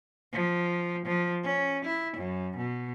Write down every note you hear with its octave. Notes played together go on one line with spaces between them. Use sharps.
F3
F3
C#4
E4
F#2
B2